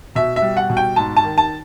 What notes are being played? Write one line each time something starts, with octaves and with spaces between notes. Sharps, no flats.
B2 E5
E5
G3
F#5
B2
G5
G#2 A5
A5
D#3
A5